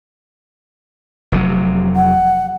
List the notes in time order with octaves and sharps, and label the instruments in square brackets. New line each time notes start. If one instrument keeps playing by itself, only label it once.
[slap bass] F1 C3 F#3
[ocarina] F#5